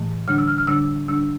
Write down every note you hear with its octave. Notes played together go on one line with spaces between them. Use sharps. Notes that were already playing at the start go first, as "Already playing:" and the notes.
Already playing: A2 E3 A3
D3 G3 D4 F6
E6
F6
F6
D3 G3 D4 E6
D3 G3 D4 E6